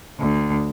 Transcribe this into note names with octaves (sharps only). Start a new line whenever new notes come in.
D2